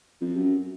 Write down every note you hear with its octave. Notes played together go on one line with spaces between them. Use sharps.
F2
F#2